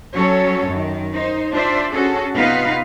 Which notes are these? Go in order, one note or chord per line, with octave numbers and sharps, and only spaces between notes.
F#3 C#4 A4 C#5
F#2 D#3
D#4 C5
D4 F4 C5 D5 E5
C#4 F#4 G#4 A4
C3 B3 D#4 F4 B4 F5